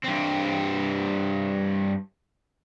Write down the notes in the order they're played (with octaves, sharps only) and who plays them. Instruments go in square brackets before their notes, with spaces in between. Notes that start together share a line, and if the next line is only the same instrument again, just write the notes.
[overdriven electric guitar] G2 C4